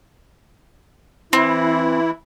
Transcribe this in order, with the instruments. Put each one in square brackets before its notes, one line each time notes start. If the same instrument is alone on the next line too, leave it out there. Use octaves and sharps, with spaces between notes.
[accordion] E3 E4 [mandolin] C4